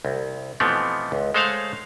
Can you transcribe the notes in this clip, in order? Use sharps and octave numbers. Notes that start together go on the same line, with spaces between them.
C2
B2 E3 F3 A3 B3 C4
C#2
G#3 A3 C5 C#5 F5 F#5